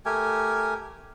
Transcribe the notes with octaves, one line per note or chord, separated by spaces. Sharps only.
A3 G4 A#4 G#5